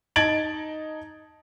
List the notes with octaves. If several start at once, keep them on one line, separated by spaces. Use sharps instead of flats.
D#4 A5 G#6 A6 D7 F#7